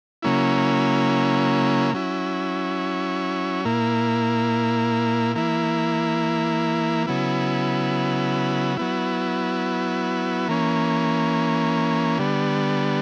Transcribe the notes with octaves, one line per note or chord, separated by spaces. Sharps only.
C#3 F#3 A#3 C#4 E4
F#3 C#4 E4
A#2 A#3 E4
E3 A#3 E4
C#3 F#3 B3 E4
F#3 B3 E4
E3 A#3 C#4
D3 G3 B3